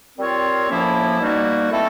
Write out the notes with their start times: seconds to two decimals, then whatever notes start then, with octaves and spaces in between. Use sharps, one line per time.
0.18 G3 C4 F4 A#4 C#5
0.69 A2 F3 A#3 C#4 E4
1.20 B2 G3 A#3 D#4 F#4
1.71 A3 C4 E4 A4